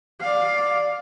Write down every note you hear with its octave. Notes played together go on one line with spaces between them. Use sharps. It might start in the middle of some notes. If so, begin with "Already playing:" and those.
D5 F5